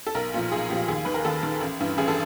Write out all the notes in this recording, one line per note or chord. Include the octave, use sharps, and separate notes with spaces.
A4
B1 A#4
A#2 F3
B1 G#4
A#2 F3 G4
D#2 G#4
D#3 B4
A#4
D#2 A4
D#3
A1
G2 E3
A1 G#4
A4